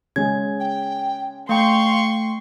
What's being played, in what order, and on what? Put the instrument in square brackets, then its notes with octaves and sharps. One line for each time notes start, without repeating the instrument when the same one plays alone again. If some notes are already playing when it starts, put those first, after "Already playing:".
[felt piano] C#3 G#3 [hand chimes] G#6
[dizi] G5
[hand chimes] A3 G5 [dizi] F5 [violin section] C6 C#6